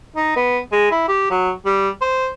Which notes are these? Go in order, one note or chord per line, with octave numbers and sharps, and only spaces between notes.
D#4
B3
G#3
E4
G4
F#3
G3
C5